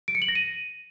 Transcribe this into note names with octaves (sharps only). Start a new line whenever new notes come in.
D7
C#7
F#7
A#6
D#7